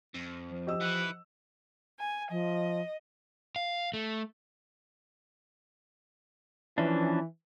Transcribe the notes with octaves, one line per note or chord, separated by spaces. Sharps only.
F2
F3
G4 D#5 E6
E3 E4 F#5
G#5
F3 D#5
F5
A3
E3 F3 C#4 D4